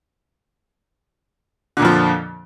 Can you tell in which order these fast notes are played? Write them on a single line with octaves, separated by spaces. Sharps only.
D3 A#2 F2 F3